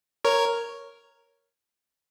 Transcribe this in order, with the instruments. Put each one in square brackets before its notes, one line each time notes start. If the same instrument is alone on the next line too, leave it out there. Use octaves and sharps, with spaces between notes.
[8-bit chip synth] A#4 C#5